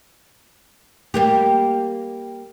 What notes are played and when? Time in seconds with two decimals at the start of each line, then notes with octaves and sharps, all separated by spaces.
1.14 G3 A#3 G4